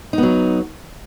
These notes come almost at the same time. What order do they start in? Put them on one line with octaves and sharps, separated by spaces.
D#4 B3 F#3